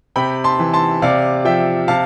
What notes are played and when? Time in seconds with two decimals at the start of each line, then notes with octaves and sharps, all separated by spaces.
0.16 C3 G5 B5
0.44 A5 C6
0.59 E3
0.74 A5 C6
1.02 C3 D5 F5
1.45 F3 E5 G5
1.88 C3 F5 A5